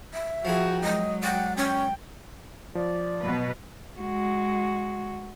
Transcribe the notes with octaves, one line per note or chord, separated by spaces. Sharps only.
E5
F3 E4 F#4 G#4 A#4 G5
F#3 G#3 D#5
D5 F#5 G5 D#6
C#4 G5
F3 D5
B2 F#3 B4
G#3 F#4